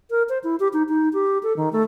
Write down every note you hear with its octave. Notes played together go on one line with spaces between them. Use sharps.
A#4
C5
E4
G4
D#4
D#4
G4
A4
D#3
A3